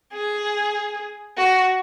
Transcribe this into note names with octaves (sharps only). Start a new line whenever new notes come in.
G#4
F#4